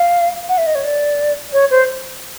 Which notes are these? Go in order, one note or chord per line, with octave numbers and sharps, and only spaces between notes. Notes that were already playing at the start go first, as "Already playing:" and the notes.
Already playing: F5
F#5
E5
D#5
C#5
D5
C#5
C5